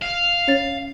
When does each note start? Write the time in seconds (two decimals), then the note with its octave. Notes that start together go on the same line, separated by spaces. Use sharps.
0.02 F5
0.48 C#4 C#5 A6